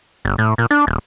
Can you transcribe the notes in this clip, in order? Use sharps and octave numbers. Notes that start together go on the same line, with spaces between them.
G1
A2
A#2
D4
D#1